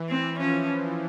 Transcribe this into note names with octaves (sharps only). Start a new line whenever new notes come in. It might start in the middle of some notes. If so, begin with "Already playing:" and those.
Already playing: E3
C4
F3 C#4